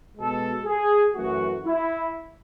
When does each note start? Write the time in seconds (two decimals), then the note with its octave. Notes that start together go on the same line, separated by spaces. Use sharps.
0.16 B2 G#3 A4
0.65 G#4
1.15 F#2 E3 A3 F#4
1.65 E4